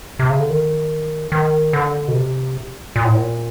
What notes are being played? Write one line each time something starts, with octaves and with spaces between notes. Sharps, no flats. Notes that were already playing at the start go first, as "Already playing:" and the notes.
C3
C#3
D3
D#3
D#3
D3
B2
C3
A#2
A2
A#2